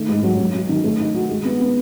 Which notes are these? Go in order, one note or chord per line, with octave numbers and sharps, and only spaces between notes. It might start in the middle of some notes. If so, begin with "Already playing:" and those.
Already playing: D#3 A3
G#2
F#3
F#3
F#3
D#3
A3
D#4
F#4
G#3
B3
B3